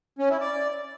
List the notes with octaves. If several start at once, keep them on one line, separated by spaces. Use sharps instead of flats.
C#4
E4
D5